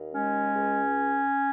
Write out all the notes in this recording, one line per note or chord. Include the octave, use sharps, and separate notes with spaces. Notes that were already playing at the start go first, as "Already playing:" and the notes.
Already playing: D#2
G#3 C#4
C#2